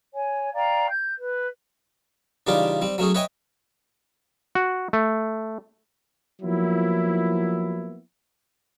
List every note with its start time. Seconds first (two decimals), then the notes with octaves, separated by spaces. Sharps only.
0.14 C#5 G#5
0.54 D5 F5 G5 A#5
0.90 G6
1.18 B4
2.47 C#3 E3 G3 D4 D#4 F4
2.82 G3 C4
2.98 F#3 A3 C#4 G#4
3.14 B4 C#5 D#5 E5 G5 G#5
4.55 F#4
4.93 A3
6.42 F3 F#3 A#3 B3 E4